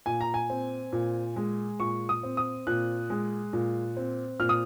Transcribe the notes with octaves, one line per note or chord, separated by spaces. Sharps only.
A#2 G#5
A#5
G#5
C4
A#2
G#3
A#2 C#6
D#6
C4
D#6
A#2 F#6
G#3
A#2
C4
A#2 F6
D#6